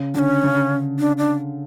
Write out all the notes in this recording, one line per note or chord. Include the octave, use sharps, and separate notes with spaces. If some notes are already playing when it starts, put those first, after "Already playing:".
Already playing: C#3
D3 C#4 D4
C#3
D4
D4